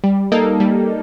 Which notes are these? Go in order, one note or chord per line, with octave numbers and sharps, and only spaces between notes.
G3
A#3 D#4 A4
G3